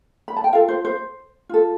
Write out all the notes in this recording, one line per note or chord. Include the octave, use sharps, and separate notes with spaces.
B5
A5
G5
F4 A4 F5
C5
C5
F4 A4